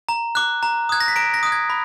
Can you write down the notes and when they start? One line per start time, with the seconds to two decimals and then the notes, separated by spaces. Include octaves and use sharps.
0.09 A#5
0.35 D6 F#6
0.63 A#5
0.89 D#6 F#6 G#6
1.00 A#6
1.08 B6
1.16 A#5 A#6 D7
1.34 A#6
1.43 D#6 F#6
1.52 G#6
1.70 B5